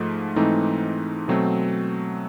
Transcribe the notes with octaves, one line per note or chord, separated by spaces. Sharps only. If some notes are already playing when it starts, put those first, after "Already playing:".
Already playing: G#2 F3 A3
G#2 E3 A3 C4 D#4
B2 F#3 A3 C4